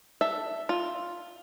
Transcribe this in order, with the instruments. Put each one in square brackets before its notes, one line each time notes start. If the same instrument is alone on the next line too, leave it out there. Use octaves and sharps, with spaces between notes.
[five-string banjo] A4 E5
F4